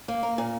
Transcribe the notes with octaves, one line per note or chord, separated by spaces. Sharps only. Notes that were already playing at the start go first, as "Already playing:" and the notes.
A#3
A#4
A#2